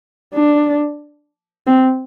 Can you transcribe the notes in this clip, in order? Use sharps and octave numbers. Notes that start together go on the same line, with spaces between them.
D4
C4